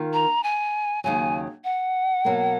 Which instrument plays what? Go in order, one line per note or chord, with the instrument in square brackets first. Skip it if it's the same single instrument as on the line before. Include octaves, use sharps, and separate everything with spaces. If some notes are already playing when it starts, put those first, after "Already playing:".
Already playing: [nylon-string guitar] D#3 A#3 F4
[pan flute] A#5
G#5
[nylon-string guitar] D#2 C#3 F#3 [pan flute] G#5
[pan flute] F#5
[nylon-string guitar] B2 F#3 A#3